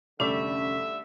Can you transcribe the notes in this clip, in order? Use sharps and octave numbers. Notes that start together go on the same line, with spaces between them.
F1 D2 D3 G3 A3 C#4 E5 D6